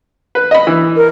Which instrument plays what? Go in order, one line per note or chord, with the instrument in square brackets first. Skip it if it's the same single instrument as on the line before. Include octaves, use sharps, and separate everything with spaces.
[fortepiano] B4
D#5 B5
E3
[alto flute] A#4